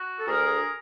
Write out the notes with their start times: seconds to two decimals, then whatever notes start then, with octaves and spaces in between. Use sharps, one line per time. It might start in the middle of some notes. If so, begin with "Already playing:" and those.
Already playing: F#4
0.19 A4
0.27 D2 G#4 A#4